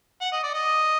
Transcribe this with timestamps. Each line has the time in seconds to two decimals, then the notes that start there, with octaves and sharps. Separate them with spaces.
0.21 F#5
0.32 D#5
0.43 D5
0.54 D#5